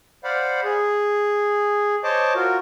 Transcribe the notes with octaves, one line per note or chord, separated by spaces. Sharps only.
C5 D5 F5 F#5 B5
G#4
C5 C#5 D#5 A5 D6
F4 F#4 A#4